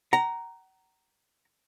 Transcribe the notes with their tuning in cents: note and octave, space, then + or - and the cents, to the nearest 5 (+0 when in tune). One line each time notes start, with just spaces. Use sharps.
F#5 +40 A#5 +0